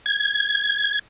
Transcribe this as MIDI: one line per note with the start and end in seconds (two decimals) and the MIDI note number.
0.06 0.99 92